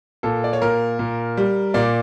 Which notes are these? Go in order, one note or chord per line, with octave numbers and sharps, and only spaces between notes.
A#2 A4
D5
C#5
A#2 A#4
A#2
G3
A#2 D5